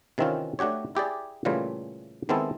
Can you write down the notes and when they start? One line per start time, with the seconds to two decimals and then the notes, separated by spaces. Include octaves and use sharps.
0.18 C3 D#3 E3 C4 C#4 F4
0.59 A3 D4 F#4 G4 C#5
0.95 E4 G4 G#4 D5
1.45 A#2 C#3 E3 G3 A3 F4
2.29 D#3 G#3 B3 C4 E4 A4